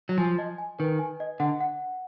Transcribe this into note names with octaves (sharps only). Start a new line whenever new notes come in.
F#3
F3 G#5
D#5
G#5
D#3 B4
G#5
D#5
D3 F#5
F#5